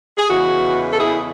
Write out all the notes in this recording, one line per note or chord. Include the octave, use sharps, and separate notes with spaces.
G#4
E2 C#3 E3 G#3 F#4
A4
E4 G#4